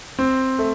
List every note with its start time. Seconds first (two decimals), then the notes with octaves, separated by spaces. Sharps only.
0.19 C4
0.59 A3